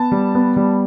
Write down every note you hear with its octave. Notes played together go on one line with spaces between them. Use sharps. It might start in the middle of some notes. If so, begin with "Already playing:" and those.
Already playing: B3 A5
G3
B3
G3